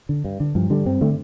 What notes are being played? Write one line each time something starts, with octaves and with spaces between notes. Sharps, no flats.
D3
G2
D3
G2 F3
D3 G3
G2 C4
D3 A3